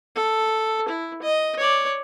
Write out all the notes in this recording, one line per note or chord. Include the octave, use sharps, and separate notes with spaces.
A4
E4
D#5
C#5 D5